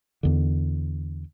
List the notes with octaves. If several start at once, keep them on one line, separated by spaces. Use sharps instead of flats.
E2 D3